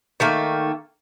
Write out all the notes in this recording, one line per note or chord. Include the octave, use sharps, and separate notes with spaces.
D#3 A3 A#3